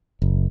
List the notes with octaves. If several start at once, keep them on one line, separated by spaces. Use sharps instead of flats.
F#1